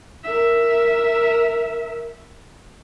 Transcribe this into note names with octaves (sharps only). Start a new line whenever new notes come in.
A#4 E5